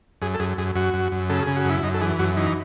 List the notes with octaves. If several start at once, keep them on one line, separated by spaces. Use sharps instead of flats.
F#2 G#4
A4
F#2 G#4
F#2 G#4
F#2 F#4
F#2
F#2
C#3 A4
G#4
C#3
F#4
F#2 E4
F#2 D#4
A4
E3 G#4
F#2 F#4
E3 D#4